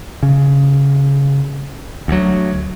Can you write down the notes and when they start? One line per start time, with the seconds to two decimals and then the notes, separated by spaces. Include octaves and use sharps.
0.23 C#3
2.08 D2 F#3